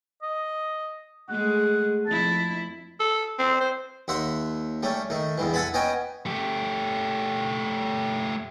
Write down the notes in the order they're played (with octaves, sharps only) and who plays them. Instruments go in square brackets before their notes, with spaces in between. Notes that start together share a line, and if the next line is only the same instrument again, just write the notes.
[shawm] D#5
[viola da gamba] G#3 A3 G#4 [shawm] F#5
[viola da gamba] F2 E4 [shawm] A5
[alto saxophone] A4
C4
C5
[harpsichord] D#2 E5 F#5 C6
G3 A3 C#4
D#3 A3
E2 G2 E3
A4 F#5 G#5 A5 B5
B3 C#4 D#5 G5 G#5
[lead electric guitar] A3 G4